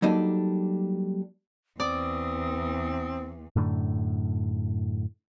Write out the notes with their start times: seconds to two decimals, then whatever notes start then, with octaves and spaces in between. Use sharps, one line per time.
0.02 F#3 G3 A#3 D4 D#4 A4
1.80 E2 C4 D5 D#6
3.56 F#2 A2 D3